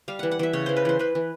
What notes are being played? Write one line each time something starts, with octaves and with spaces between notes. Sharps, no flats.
G3 F5
E3 F#5
F#5
E3 E5
C#3 C#5
E3 C5
B4
E3 C5
E3 B4
E3